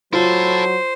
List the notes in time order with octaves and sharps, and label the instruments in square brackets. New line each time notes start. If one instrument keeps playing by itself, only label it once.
[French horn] F#3 [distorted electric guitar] E4 A4 [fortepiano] F4 [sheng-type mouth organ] C5